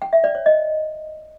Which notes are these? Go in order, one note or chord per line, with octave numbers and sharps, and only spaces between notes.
G5
E5
D5
C#5
D#5